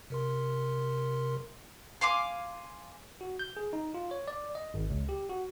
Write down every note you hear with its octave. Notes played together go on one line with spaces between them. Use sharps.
C3 A#4 C6
F5 G#5 C6 D6
F#4
G6
G#4
D#4
F4
C#5
D5
D#5
G#1
C#2
G4
F#4